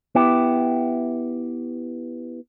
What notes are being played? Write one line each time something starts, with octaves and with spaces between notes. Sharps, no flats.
B3 E4 G4